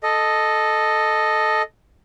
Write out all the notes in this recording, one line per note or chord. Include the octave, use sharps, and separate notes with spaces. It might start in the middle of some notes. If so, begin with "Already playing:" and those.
A4 D#5